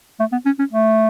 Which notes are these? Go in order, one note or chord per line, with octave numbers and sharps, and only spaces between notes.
A3
B3
C#4
C#4
A3